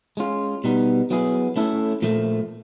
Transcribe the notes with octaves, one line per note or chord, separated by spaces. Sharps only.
G#3 C#4 F4
B2 G3 B3 D#4
F#3 B3 E4 G#4
A3 C#4 E4 A4
A#2 F3 A3